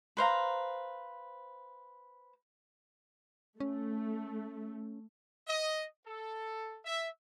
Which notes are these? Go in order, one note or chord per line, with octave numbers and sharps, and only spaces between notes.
B4 C5 F5 A#5
A3 C#4
D#5
A4
E5